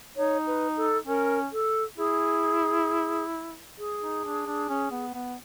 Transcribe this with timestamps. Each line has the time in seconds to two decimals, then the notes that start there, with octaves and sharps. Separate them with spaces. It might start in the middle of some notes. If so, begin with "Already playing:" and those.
0.17 D#4 C#5
0.47 B4
0.77 A4
1.07 C#4 A#4
1.53 A4
1.97 E4 G#4
3.79 G#4
4.01 D#4
4.24 D4
4.46 D4
4.69 C#4
4.91 B3
5.14 B3